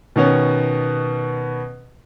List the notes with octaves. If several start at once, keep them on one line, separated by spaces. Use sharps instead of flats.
B2 D#3 B3 C#4